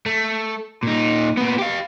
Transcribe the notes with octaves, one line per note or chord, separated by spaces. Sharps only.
A3
A#2 D#4
A#2 B3
G4 F5